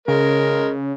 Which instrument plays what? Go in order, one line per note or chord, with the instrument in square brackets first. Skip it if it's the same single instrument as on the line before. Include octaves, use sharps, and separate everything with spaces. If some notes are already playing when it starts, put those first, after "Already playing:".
[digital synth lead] C#3 [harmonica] G#3 A#4